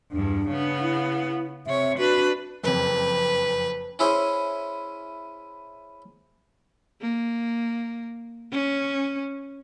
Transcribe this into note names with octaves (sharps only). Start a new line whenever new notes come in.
E2 G2 D4
C#3 B3
E4
C3 C#5 E5
D4 F#4 B4
F#1 F2 B4
C#4 E4 G#4 C5
A#3
C#4